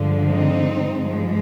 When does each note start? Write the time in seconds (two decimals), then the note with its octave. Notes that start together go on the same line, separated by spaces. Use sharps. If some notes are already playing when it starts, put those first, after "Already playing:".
Already playing: G2 D3 F3 G#3
0.27 C4 D#4
0.92 G2 F3 G#3